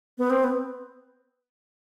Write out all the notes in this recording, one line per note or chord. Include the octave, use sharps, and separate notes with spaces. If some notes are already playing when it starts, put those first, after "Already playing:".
B3
C4
B3